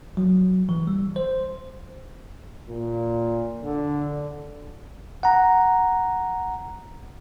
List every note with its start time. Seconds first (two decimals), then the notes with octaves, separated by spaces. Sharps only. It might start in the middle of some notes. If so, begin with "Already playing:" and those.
0.17 F#3
0.69 E3
0.87 G3
1.16 C5
2.69 A#2
3.63 D3
5.23 F#5 A#5